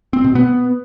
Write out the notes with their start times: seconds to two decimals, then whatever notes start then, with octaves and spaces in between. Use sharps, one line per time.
0.13 C4
0.24 B2
0.35 B3